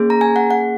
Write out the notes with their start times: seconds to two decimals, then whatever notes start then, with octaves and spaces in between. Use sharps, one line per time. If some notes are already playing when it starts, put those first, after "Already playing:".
Already playing: A#3 C#4 G#4
0.10 A#5
0.21 G#5
0.36 F#5
0.51 F#5